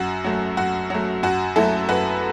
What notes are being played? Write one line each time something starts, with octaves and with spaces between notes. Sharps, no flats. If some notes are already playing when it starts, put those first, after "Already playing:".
Already playing: F#2 F#4
F#3 A3
F#2 F#4
F#3 A3
F#2 F#4
F#3 A3 E4 A4
F#2 F#4 B4